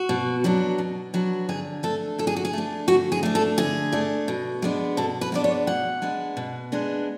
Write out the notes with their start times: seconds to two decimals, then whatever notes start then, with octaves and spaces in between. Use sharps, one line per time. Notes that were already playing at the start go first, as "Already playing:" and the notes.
Already playing: F#4
0.09 B2
0.44 F#3 B3 D4
0.78 B2
1.14 F#3 B3 D4
1.49 D3 G#4
1.83 A3 D4 A4
2.18 D3 A4
2.27 G#4
2.36 F#4
2.45 G#4
2.53 A3 D4
2.88 D3 F#4
3.12 G#4
3.23 A3 D4
3.35 A4
3.58 D3 G#4
3.92 A3 D4
4.28 B2
4.62 G#3 B3 D4
4.97 B2 A4
5.21 B4
5.32 G#3 B3 D4 D5
5.44 C#5
5.67 B2 F#5
6.02 G#3 B3 D4
6.37 B2
6.72 G#3 B3 D4